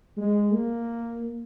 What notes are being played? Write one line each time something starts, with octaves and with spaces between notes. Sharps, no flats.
G#3
A#3